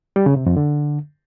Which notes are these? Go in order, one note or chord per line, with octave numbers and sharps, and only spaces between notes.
G3
C#3
C3
F2
D3